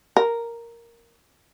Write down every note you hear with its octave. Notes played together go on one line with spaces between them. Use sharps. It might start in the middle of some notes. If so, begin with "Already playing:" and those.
A#4